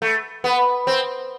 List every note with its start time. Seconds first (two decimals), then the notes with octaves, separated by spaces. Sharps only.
0.02 A3
0.44 B3
0.87 C4